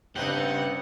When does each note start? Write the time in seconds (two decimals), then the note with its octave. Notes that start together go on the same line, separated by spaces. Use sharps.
0.16 G2 C#3 B3 C4 D#4 G4 F#5